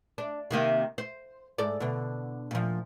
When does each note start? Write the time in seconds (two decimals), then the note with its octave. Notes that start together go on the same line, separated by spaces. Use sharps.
0.18 D4
0.51 C3 D#3 A#3
0.98 C5
1.58 G#2 A4 D5
1.80 B2 D3
2.51 A#2 F3